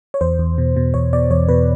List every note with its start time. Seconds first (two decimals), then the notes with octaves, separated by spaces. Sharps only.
0.14 C#5
0.21 E2 C5
0.39 E2
0.58 B2
0.76 B2
0.94 E2 C#5
1.13 B2 D5
1.31 E2 C#5
1.48 B2 B4